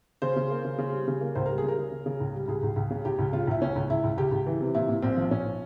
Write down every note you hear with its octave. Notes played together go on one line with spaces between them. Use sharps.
C#3 C5
C#3
A#3
C#3
C#3
G3
C#3
A#3
C#2 C5
G3 A#4
G#4
C#3 A#4
C#3
C#3
C#3
C#2
G3
C#2 G#4
C#2
C#2
C#3
C#2 G4
C#2
C#3 F4
C#2 E4
C#2 C#4
C#2
C#2 E4
C#2
C#2 G4
C#2
E3
C3
A#2 E4
A#2
A#1 C4
F3
A#1 C#4